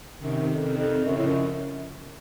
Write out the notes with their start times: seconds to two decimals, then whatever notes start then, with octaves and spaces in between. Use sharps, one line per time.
0.19 F#2 C3 D#3
0.48 F2
0.62 C3 D#3
0.77 F2
1.05 F#2 C#3 F3
1.18 A2
1.27 F#2